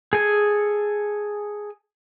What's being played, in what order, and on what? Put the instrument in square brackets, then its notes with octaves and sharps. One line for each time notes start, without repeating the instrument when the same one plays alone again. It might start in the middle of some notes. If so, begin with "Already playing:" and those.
[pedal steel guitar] G#4 A4 G#5